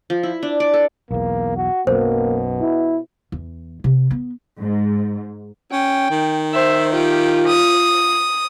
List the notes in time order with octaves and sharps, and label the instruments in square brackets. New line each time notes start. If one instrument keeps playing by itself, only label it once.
[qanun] F3
E4
D4
D5
A4
[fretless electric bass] B1 E2 [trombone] A#3
[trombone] F#4
[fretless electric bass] B1 F#2 [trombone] B2 [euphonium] A#3 [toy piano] C5
[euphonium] E4
[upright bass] E2
C3
B3
[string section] G#2
[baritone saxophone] C#4 [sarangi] G5
[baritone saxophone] D#3
[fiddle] C5 [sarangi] E5
[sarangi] F4 [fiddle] G4
[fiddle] D#6